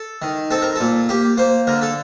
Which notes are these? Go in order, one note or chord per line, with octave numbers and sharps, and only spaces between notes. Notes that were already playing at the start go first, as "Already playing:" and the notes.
Already playing: A4
D#3
C4 A4
A#4
A#2 A4
A#3 G4
A#3 C5
D3 A#4
A4